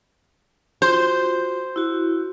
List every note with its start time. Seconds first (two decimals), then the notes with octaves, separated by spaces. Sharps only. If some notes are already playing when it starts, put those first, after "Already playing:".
0.82 F4 F#4 C5
1.76 E4 F#4